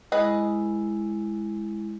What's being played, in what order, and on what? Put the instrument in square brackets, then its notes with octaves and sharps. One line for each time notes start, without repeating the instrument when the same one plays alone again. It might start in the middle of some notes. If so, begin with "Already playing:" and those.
[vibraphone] G#3 E4 [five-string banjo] G#4 B4 D#5